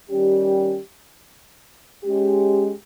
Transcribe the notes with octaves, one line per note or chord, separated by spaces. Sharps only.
D#3 G3 C#4 G4
G#3 C#4 G4